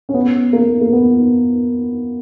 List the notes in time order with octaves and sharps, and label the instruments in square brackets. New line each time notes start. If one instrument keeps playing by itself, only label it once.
[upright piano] C#4
B3
A#3
A#3
B3